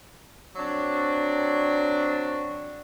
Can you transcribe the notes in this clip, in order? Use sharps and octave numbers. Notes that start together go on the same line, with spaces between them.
F#3 C4 D4